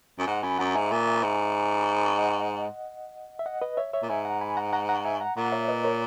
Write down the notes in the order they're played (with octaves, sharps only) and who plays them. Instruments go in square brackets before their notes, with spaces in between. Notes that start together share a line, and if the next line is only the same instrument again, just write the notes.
[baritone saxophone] F#2 [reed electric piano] G#5
[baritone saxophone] G#2 [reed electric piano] F#5 A#5
[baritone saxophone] F#2 [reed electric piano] G#5 B5
[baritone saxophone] F#2 [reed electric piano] F#5 A#5
[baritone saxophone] G#2 [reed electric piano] E5 G#5
[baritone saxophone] A#2
G#2
[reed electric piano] D#5 F#5
E5
D#5 F#5
B4 D#5
C#5 E5
C#5 E5
[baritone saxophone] A#2
[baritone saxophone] G#2 [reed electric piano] E5 G#5
[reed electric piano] F#5 A#5
G#5 B5
F#5 A#5
F#5 A#5
F#5 A#5
E5 G#5
F#5 A#5
[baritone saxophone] A#2 [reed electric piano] F#5 A#5
[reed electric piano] C#5 E5
B4 D#5
A#4 C#5